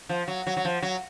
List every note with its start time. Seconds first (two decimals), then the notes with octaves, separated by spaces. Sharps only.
0.09 F3
0.28 F#3
0.47 F#3
0.57 F#3
0.65 F3
0.82 F#3